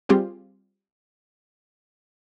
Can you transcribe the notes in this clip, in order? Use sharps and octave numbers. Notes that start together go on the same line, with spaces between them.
G3 C4 F4 G4 G#4